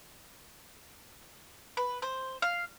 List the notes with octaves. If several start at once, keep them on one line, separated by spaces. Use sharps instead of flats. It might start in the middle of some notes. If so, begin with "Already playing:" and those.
B4
C5
F5